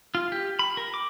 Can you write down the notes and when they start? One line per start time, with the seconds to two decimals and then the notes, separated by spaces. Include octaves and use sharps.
0.15 F4
0.32 G4
0.59 B5
0.77 A#4
0.94 D6